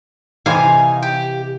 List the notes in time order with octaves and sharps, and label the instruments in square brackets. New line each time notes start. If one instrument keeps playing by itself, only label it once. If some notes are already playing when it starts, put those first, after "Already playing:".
[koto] C3 E3 F5 [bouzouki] D#4 G#5
[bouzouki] G4